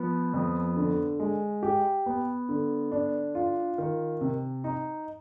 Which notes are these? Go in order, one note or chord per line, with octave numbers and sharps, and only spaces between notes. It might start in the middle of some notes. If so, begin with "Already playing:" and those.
Already playing: F3 B3
F2
D3
G#3
G4
B3
D3
D4
F4
D#3
C3
D#4